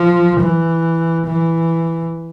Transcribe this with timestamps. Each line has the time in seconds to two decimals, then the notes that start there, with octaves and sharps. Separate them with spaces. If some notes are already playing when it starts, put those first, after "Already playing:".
Already playing: F3
0.40 E3
1.26 E3